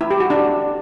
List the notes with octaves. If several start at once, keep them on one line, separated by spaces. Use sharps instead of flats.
E4
G4
F#4
D4